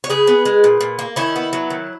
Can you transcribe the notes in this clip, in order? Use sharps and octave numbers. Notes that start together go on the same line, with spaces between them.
C#5
C#3 G#4 B4
B3
G#3
A#2
A#2
A#3
D#3 C#4 E4
B3
F#3
D#3